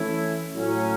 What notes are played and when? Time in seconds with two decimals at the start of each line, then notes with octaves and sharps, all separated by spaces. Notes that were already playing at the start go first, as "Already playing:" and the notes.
Already playing: E3 A3 C#4 E4
0.53 A2 F#3 C#4